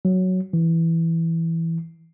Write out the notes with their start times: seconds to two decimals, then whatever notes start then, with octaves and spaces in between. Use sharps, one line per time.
0.05 F#3
0.53 E3